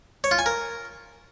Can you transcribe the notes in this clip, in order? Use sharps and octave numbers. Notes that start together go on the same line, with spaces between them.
C#5
F4
G#5
A#4